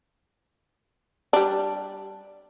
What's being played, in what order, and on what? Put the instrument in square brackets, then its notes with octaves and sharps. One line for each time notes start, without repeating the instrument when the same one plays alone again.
[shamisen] G3 D4